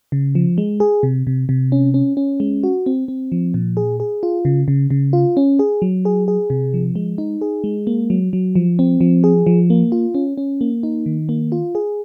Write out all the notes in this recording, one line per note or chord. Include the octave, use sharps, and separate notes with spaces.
C#3
F3
G#3
G#4
C3
C3
C3
C#4
C#4
C#4
G#3
F#4
C4
C4
F3
A#2
G#4
G#4
F4
C#3
C#3
C#3
F4
C#4
G#4
F#3
G#4
G#4
C3
F3
G#3
D#4
G#4
G#3
A#3
F#3
F#3
F3
C4
F3
G#4
F3
A#3
F4
C#4
C#4
A#3
D#4
D#3
A#3
F4
G#4